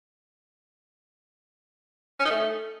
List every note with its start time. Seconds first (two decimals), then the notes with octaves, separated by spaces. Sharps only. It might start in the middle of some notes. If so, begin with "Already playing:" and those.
2.20 C#4
2.25 D#4
2.31 A3